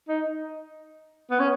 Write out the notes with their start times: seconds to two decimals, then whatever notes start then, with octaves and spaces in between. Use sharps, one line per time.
0.08 D#4
1.30 B3
1.39 C#4